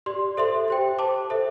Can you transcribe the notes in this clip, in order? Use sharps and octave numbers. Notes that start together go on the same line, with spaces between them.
G4 D5 C6
A4 C5 E5 C6
G4 C5 G5
C5 A5 D6
A4 C5 E5